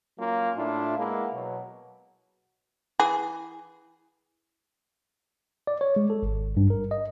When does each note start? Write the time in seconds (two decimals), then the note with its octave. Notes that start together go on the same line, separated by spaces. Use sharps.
0.18 F#3 A#3 C#4 F4
0.56 A2 D4 E4 F4
0.98 G#3 A#3 B3 E4
1.33 B2 F#3
3.00 E3 G#4
5.67 D5
5.81 C#5
5.96 G#3
6.10 A4
6.23 G#1
6.57 G2
6.70 A#4
6.91 D#5